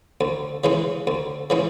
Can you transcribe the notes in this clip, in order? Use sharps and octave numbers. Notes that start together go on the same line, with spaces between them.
D2
C#3 E3 G#3
D2
C#3 E3 G#3